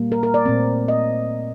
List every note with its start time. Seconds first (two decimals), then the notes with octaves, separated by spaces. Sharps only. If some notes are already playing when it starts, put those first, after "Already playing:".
Already playing: A#2 G3 A#3
0.12 A#4
0.23 A#4
0.34 D5
0.46 A#2 A3 C4
0.88 D#5